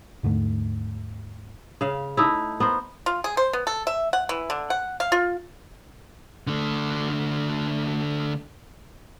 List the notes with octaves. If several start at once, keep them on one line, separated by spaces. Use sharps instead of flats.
D#2 G#2 D3 A3
C#3 F5
A3 D#4 E4
B3 A#4 C5
F4
G#4
C5
B3
A4
E5
F#5
E3
D3
F#5
F5
F4
D3 A3